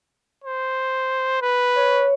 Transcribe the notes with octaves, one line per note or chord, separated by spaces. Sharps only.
C5
B4
C#5